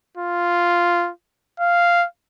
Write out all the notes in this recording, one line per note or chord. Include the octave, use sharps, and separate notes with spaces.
F4
F5